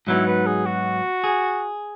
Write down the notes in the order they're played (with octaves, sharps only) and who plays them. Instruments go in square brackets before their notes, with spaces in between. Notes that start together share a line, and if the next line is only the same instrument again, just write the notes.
[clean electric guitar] G#2 F#3 B3 D#4 [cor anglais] E4
[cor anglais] B4
G#4
F#4
[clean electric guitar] G#4